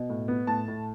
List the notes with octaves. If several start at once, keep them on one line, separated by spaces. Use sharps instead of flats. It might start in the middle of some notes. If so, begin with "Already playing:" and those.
Already playing: B2
A2
B3
A2 A5
A2